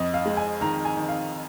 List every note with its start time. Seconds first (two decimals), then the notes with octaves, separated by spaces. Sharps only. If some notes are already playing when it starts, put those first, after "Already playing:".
Already playing: F2 D#5
0.14 F5
0.26 G#3
0.37 G#5
0.61 D#3 A#5
0.85 G#5
0.97 D#3
1.08 F5